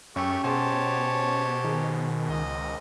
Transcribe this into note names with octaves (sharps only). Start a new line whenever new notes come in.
F#2 A3 C#4 G4 G5 C#6
B2 G4 G#4 C5 C#5 F#5 A5
D#3 G#4 A#4
C#2 D#5